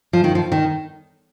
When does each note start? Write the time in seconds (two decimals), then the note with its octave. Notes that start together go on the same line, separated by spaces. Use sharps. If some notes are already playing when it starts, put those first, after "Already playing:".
0.13 F3
0.24 D#3
0.35 F3
0.52 D#3